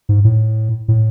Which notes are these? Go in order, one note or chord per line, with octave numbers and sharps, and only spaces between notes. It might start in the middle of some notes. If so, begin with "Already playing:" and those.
G#2
A2
A2